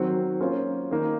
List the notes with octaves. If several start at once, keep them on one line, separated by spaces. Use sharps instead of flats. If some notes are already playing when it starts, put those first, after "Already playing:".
Already playing: D#3 F#3 C4 F#4 C5
A#3 C#4 F4 C5
D#3 A#3 D#4